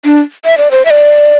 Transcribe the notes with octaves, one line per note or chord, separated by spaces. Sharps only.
D4
E5
D5
C5
E5
D5